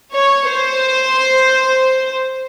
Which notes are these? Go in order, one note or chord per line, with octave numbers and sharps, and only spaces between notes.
C#5
C5